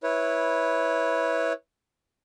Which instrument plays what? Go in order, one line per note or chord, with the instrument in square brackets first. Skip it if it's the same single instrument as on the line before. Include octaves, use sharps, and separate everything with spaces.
[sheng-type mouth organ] E4 B4 C#5